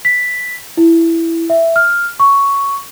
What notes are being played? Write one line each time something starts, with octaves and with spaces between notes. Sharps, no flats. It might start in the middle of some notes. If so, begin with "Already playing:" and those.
B6
E4
E5
F6
C#6